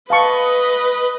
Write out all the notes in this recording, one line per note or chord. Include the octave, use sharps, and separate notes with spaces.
B4 D#5 F5 A5 C#6